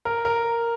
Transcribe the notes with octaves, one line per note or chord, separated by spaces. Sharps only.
A#4
A#4